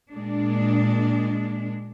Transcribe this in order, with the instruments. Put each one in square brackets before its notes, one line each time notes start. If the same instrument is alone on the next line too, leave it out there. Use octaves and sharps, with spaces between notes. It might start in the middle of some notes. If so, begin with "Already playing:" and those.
[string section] A#2 G#3 D4